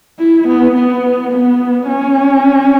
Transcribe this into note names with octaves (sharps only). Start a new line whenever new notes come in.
E4
B3
B3
B3
C#4